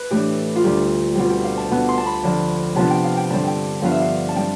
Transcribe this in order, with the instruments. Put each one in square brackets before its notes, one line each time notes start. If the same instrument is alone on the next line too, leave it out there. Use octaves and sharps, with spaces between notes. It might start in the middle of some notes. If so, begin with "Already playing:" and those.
Already playing: [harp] B4
A2 E3 A3 D4 G4
F4
D2 D3 G3 G4
B2 G3 C4 F4
G4
F5
A5
B2 B3 D4
C6
A5
B5
F2 D3 F3
C3 F3 B3 D4 A5
G5
F5
G5
G2 D3 G3 C4 A5
G5
G2 F3 B3 D4 F5
E5
F5
A5
G3 C4 G5